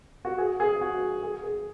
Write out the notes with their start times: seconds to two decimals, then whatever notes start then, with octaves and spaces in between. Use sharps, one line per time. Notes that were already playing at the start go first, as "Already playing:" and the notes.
0.25 F#4
0.38 G#4
0.60 G#4
0.81 F#4
1.23 G#4
1.43 G#4